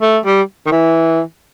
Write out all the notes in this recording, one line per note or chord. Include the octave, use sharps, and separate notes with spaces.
A3
G3
D#3
E3